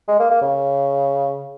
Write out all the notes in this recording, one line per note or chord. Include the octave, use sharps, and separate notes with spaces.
G#3
A#3
A#3
C#3